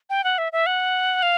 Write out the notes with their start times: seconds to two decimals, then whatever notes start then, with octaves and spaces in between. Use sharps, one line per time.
0.10 G5
0.24 F#5
0.38 E5
0.53 E5
0.66 F#5
1.23 F5